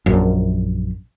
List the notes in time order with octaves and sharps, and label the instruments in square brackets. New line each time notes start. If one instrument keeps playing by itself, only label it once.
[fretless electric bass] A#1 F#2